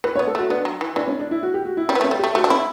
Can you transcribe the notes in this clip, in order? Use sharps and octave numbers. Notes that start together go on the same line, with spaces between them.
E3 B4
C#5
B3
A4
A3 F#4
B3 D4
F#3
E3
E3 D4
C#4
D4
E4
F#4
G4
F#4
E4
G3 C#4
B3
A3
C#4
G3
G4
A3
A3 F#4
D4
C#4 E4